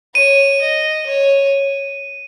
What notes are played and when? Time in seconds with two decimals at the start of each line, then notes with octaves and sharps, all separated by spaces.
0.15 C#5 D#7
0.61 D#5
1.06 C#5